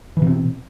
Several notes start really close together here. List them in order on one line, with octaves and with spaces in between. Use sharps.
E3 B2 C4